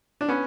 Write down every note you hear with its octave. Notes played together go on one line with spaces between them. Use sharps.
D4
B3 C#4